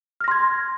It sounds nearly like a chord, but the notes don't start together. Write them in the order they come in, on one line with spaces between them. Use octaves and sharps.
F6 A#6 C6 G#6